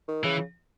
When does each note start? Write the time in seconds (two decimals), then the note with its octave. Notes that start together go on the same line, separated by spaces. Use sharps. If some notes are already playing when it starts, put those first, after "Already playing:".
0.08 D#3
0.24 C#3 E3